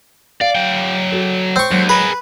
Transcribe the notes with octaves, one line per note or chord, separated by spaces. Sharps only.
D5 F5
F#3 G5
F#4 A4
C4 C#5 C#6
D#2 F#3 G#3
G#4 A#4 B4